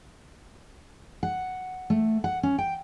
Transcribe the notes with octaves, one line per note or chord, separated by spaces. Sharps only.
F#5
A3
F#5
C#4
G5